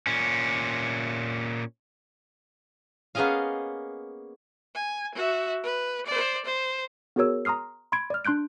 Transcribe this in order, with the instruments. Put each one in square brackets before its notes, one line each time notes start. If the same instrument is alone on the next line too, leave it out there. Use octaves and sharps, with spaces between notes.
[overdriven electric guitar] A#2 C#4
[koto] A#3 B3 C#4 G#4 D#5 F5
[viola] G#5
F#4 E5
B4
C5 D5
C5
[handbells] B3 F#4 G#4 A#4 C#5 E6
A#5 C6 D#6 F6 C7
B5 C6 G#6 D7
D5 F6
D4 C6 F#6 G6 D7